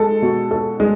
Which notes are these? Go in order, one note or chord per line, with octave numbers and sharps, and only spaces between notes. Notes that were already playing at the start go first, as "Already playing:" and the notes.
Already playing: G#3 A4
B2
A4
G#3